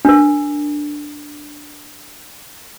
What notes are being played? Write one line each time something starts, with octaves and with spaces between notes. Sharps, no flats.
D4 A#4